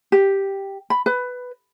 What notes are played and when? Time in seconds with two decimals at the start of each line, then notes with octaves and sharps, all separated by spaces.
0.12 G4
0.90 B5
1.06 B4